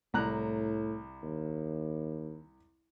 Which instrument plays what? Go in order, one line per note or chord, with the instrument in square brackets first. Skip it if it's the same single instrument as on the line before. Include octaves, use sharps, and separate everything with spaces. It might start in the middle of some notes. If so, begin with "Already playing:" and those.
[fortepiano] C2 A#5 F#6 [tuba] A2
[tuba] D#2